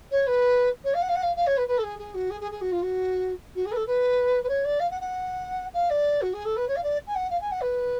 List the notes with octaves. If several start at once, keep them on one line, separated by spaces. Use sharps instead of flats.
C#5
B4
C#5
F5
F#5
F5
F#5
F5
F5
C#5
B4
B4
A4
G#4
G#4
F#4
G#4
G#4
G#4
F#4
F4
F#4
F#4
G#4
B4
A4
B4
B4
C#5
D5
F5
F#5
F#5
F5
D5
F#4
G#4
A4
B4
C#5
F5
D5
G#5
F#5
F5
G#5
F#5
B4